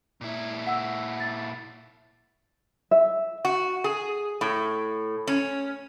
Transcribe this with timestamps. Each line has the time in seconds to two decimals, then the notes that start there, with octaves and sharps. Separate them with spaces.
0.21 A#2 E4
0.67 F#5 E6
1.20 A6
2.91 E5
3.45 F#4
3.84 G#4
4.41 A2
5.27 C#4